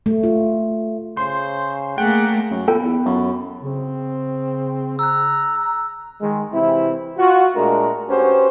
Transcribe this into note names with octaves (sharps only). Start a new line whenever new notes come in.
A3
F4
C#3 C5 C6
A3 A#3 G#4 F#5 G5
F#2
A#2 B3 A4 G5
E2
F#2
C#3 C4
A#5 E6 F#6
D#3 G#3
C3 E3 C4 E4
F4 F#4
A#2 G#3 A3 D4 A#4
C#4 F#4 G4 B4 C5